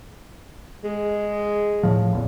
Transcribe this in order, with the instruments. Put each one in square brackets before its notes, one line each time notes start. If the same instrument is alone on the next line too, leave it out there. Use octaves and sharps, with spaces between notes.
[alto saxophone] G#3
[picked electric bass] A2 F3
A1 E2 A#2